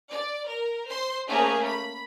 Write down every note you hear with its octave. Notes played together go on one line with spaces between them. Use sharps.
D5
A#4
C5 C6
A3 A#3 C#4 G#4
B5